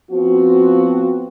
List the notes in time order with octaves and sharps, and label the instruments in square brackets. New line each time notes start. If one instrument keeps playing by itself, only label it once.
[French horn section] F3 B3 C4 F#4